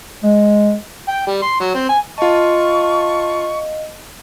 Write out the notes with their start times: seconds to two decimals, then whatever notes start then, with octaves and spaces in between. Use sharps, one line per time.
0.23 G#3
1.08 G5
1.27 G3
1.42 C6
1.60 F#3
1.75 C4
1.89 G#5
2.18 F4 D#5 F5 A5 C#6